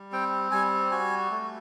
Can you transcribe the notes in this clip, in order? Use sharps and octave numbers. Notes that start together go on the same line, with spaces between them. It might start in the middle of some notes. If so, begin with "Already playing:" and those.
Already playing: G3
C4 G5
G3 G#5
F#4 G#5
A3